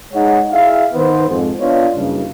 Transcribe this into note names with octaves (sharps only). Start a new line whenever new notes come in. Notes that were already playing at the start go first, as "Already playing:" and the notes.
G#3 D#4 G#4 C#5 F#5
E4 G#4 E5 F5
D#3 B3 C5
F2 G#2
B3 D4 F4 C#5 D#5
F#1 G2 C#3